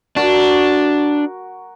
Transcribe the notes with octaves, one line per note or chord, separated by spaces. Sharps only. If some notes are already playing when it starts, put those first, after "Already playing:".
D4 F#4 A#4